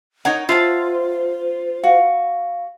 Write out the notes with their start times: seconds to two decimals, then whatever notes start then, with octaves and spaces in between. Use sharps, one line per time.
0.25 D#4 A#4 C#5 F#5
0.49 F4 C5 E5 F#5 A5
1.84 F#4 F5